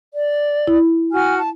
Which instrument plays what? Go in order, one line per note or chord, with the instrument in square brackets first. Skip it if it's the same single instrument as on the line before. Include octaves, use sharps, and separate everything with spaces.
[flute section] D5
[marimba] E4
[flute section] F#4 G#5 F6
A5